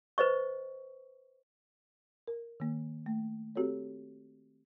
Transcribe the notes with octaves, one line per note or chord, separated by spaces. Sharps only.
B4 C5 D#5 C#6
A#4
D#3 A#3
A3
C4 F#4 G4 A4 C#5